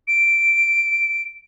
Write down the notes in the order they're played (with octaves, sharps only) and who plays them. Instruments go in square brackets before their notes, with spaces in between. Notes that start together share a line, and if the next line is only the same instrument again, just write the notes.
[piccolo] D7